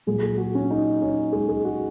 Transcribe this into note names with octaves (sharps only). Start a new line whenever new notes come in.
A#2 F#3 G#4
G#4
F#4
C#4
D#4
C#4
G#3
G#3
F#4